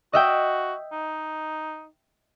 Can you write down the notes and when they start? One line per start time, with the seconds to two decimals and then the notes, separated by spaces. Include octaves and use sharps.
0.13 F#4 D#5 E5 G5
0.92 D#4